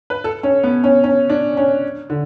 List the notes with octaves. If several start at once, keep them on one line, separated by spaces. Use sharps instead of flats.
B4
A4
C#4
B3
C#4
C#4
D4
C#4
D3